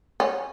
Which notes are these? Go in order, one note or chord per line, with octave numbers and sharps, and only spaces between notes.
C#4